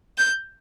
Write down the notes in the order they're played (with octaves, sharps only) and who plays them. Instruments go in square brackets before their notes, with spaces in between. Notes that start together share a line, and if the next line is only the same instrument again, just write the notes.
[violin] G6